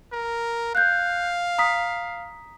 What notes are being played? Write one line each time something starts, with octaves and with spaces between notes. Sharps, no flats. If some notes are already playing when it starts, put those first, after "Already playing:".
A#4
F5 F#6 G6
A#5 D#6 B6